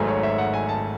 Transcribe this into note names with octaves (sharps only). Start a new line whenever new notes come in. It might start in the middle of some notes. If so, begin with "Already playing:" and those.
Already playing: G#1 G#2 F#3 A3 G#5
C#5
E5
F#5
G#5
A5